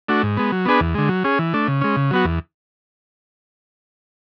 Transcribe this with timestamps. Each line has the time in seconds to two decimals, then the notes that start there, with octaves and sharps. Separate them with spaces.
0.08 A3 D4 F#4
0.23 G#2
0.37 G#3 B3
0.52 F#3
0.65 B3 D4 G#4 B4
0.80 E2
0.95 D3 G#3
1.09 F#3
1.24 C#4 G#4
1.39 E3
1.54 A3 D4
1.68 C#3
1.81 G#3 C#4
1.97 C#3
2.11 F#3 B3 F#4
2.25 E2